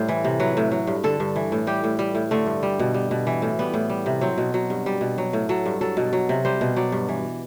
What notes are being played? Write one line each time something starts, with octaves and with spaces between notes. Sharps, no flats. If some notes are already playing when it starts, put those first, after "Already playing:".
Already playing: A2 G3 C5
E3
C3
F#3 B4
A2
F#3
G2
D3 A4
G2
E3
A2
G3 G4
A2
G3
A2
D3 A3
G2
G3
B2
G3
B2
E3
A2
G3 B3
A2
G3
C3
F#3 C4
B2
F#3
G2
G3
B2
F#3
A2
F#3 A4
G2
F#3 A4
B2
F#3
C3
G3 C5
B2
F#3 D5
G2
E3